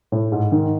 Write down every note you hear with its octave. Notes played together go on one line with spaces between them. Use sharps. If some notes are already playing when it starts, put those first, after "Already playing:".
A2
G#2
D#3